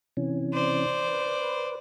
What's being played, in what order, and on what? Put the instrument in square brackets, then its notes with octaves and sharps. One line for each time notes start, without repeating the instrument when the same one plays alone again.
[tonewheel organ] C3 E3 C#4
[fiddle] C5 D5
[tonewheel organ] B4